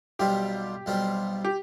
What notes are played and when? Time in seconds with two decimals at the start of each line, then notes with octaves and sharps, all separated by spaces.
0.19 B1 B2 G3 C4 F4 G4
0.86 B1 B2 G3 C4 F4
1.45 G4